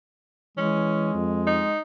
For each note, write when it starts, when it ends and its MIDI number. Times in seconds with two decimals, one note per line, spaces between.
0.57 1.14 52
0.57 1.74 56
0.57 1.16 61
1.14 1.63 41
1.47 1.81 63